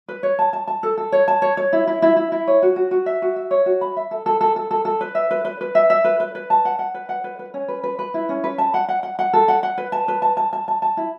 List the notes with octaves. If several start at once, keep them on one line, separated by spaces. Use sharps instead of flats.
B4
C#5
A5
A5
A5
A4
A4
C#5
A5
C#5
C#5
E4
E4
E4
E4
E4
C#5
F#4
F#4
F#4
E5
F#4
E5
C#5
F#4
B5
E5
A4
A4
A4
A4
A4
A4
B4
E5
B4
B4
B4
E5
E5
B4
B4
B4
A5
F#5
F#5
B4
F#5
B4
B4
C#4
B4
B4
B4
E4
C#4
B4
A5
F#5
F#5
F#5
F#5
A4
F#5
F#5
B4
A5
B4
A5
A5
A5
A5
A5
E4